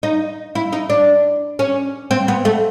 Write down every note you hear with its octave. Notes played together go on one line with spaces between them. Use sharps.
D#4
E4
D#4
D4
C#4
C4
B3
A3